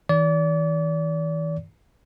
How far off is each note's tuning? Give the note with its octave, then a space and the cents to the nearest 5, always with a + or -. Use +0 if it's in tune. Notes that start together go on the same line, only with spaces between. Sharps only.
E3 -45 D5 -35